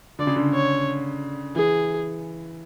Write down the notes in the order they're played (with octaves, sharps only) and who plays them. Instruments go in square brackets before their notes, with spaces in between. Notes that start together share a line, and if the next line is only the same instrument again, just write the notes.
[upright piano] D3 [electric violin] D5
[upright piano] C#3
D3
[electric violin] C#5
[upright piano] E3 [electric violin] G#4